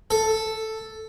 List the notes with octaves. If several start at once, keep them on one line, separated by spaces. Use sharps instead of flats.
A4